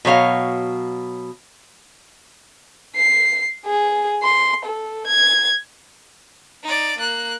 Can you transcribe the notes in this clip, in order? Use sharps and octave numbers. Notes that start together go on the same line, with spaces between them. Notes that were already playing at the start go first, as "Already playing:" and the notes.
B2 F#3 C#5 F5
C7
G#4
C6
A4
G#6
D#4 D5
A#3 F#6